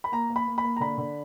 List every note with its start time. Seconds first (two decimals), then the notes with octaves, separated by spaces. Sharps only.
0.04 B5
0.12 A#3 A#5
0.30 A#3
0.36 B5
0.47 A#3
0.58 B5
0.64 A#3
0.77 A#5
0.80 D3 B5
0.98 D3